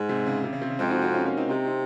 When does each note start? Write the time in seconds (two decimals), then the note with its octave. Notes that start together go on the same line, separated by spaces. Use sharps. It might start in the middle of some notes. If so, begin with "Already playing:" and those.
Already playing: G#2
0.09 C3
0.26 C#3
0.44 C3
0.53 C#3
0.62 C3
0.70 C#3
0.79 F2 G#3 C4
0.90 D#4 F#4
1.02 D#4 F#4
1.14 C#4 F4
1.26 A#3 C#4
1.37 C4 D#4
1.49 C3 C4 D#4
1.66 C4 D#4